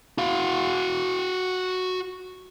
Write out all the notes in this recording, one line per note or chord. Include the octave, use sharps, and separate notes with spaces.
F#4 F5